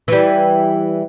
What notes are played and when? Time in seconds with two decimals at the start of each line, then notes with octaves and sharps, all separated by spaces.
0.08 E3 G3